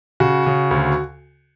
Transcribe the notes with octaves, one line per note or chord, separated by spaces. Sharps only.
C#3 F#4
C#3
D2